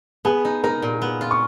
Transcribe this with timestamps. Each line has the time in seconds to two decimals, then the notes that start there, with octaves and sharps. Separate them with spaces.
0.25 B3 G#4 G#5
0.45 D#4
0.64 D#4 A#4 A#5
0.82 A#2
1.02 B3
1.21 F4
1.31 C#6